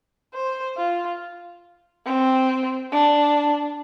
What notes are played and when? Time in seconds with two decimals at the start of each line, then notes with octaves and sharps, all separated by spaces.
0.33 C5
0.77 F4
2.05 C4
2.92 D4